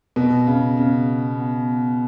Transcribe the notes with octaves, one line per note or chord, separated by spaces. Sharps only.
B2 B3
C#3
C#3
B3